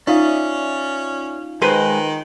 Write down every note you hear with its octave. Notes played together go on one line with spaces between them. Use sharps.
C#4 D#4 F4 D5 E5 F5 D#6
D#3 G#3 B4 C5